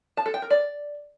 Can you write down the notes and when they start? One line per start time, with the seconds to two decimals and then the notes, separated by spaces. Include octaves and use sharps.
0.17 A5
0.26 A4
0.34 G5
0.42 A#4
0.50 D5